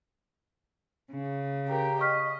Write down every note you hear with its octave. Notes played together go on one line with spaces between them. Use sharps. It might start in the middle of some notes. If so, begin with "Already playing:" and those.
C#3
G4 A#4
D#5 C#6 F6 B6